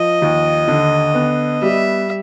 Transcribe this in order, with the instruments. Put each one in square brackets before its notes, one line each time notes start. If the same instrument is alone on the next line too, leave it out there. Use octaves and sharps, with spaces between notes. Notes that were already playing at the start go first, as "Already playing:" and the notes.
Already playing: [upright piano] F3 [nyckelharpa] D#5
[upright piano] D#2
D3
B3
[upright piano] G3 [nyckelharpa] E5